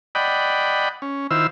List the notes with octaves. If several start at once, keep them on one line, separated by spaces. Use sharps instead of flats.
D5 D#5 F#5 G5 B5
C#4
D#3 E4 F4 C5 E6